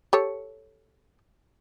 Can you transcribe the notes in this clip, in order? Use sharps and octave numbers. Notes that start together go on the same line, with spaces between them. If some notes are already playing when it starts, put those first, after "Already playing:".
G4 A4 C#5